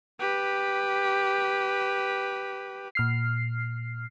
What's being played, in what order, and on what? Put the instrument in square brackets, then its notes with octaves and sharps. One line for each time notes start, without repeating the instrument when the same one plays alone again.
[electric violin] G4 B4
[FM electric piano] A#2 F6 C7